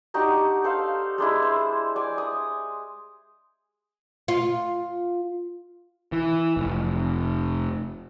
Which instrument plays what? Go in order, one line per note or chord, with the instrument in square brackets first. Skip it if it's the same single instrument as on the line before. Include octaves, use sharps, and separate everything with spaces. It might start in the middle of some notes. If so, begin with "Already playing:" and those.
[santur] D4 D#4 F#4 G4
A4 C5 F5
G#3 D4 E4
C5
D5 G#5
D#6
[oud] F4
[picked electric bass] E3
F1